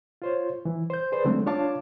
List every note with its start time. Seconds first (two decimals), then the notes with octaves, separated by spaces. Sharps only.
0.22 F4 C5 C#5
0.65 E3
0.90 C5 G6
1.12 G#4 B4 C5 D5
1.25 D3 F#3 G#3 A3 C4 D4
1.46 D4 F4 C#5 F5 A5 D6